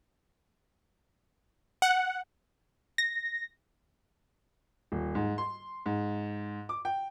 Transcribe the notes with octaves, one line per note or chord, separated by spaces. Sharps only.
F#5
A#6
D#1
G#2
C6
G#2
D6
G5